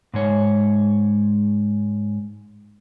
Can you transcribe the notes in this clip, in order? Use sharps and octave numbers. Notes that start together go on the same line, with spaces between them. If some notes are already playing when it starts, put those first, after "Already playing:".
G#2 G#3 C#5